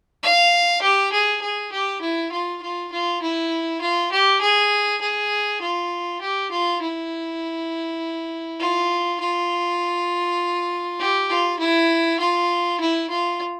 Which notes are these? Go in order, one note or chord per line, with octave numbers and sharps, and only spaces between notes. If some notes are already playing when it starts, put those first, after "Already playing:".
F5
G4
G#4
G#4
G4
E4
F4
F4
F4
E4
F4
G4
G#4
G#4
F4
G4
F4
E4
F4
F4
G4
F4
E4
F4
E4
F4